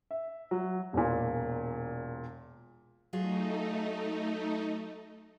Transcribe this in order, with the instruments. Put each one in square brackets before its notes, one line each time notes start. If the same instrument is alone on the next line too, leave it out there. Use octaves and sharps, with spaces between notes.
[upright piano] E5
F#3
[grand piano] E1 A#2
[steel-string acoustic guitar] F#3 F4 G#4 [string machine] A3 D#4